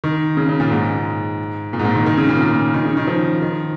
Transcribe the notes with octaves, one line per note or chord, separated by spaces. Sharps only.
D#3
C#3
C#3
A#2
G#2
A#2
G#2
A#2
D#3
D#3
C#3
A#2
A#2
A#2
D#3
C#3
D#3
F3
D#3